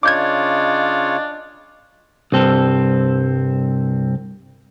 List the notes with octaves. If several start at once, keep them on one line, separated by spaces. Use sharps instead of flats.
C#3 D4 F4 C#5 D#5 D6 G6 G#6
C2 G2 C4 A4